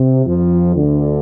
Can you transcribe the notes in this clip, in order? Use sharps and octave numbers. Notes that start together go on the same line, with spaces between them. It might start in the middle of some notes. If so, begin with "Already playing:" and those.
Already playing: C3
F2 F3
D2 D3